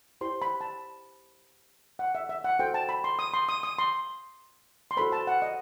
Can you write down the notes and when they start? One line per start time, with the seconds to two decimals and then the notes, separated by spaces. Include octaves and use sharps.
0.21 E4 G4 C5 C6
0.42 B5
0.61 A5
1.99 F#5
2.15 E5
2.29 E5
2.44 F#5
2.59 F#4 A4 C5 G5
2.74 A5
2.89 B5
3.04 C6
3.19 D#6
3.34 C6
3.49 D#6
3.63 D#6
3.79 C6
4.91 C6
4.97 F#4 A4 C5 B5
5.12 A5
5.27 F#5
5.42 D#5